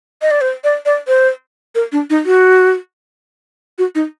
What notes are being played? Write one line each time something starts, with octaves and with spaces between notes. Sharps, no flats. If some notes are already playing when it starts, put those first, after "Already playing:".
D#5
D5
C5
D5
D5
C5
A#4
D4
D#4
F#4
F#4
D#4